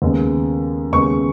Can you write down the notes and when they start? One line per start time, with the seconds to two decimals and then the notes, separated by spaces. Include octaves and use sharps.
0.02 D#2 C#3 G#3 B3
0.92 D#2 C#3 G#3 B3 C#6